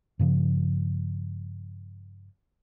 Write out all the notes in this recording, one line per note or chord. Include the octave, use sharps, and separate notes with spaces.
G2 C#3 F3